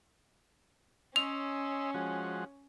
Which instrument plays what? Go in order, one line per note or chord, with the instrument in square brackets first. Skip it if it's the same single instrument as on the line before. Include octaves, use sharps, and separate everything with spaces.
[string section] C#4 [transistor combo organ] D#5 C6 E6 [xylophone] F7
[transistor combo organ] F3 G#3 F#4